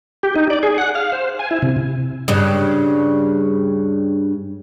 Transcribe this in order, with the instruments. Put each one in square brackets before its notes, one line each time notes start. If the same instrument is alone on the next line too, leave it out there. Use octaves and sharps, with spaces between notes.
[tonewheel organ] G4
D#4
D5
G#4
F#5
F5
C5
G#5
E4
C3
[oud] G2 C#3